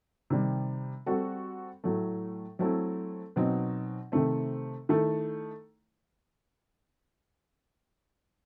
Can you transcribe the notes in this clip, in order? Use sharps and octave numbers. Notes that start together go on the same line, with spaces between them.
C3 D#3 G3
G3 C4 F#4 A4
A2 F#3 A3
F#3 A3 C4 E4 A4
B2 F#3 C4 D#4
C3 D#3 A3 C4
D#3 A3 E4 A4